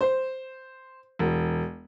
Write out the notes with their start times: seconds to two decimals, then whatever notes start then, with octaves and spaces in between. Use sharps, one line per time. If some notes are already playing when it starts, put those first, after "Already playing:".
0.01 C5
1.19 E1